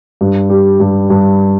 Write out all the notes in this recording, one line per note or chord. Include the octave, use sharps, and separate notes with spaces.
G2
G3
G2
G2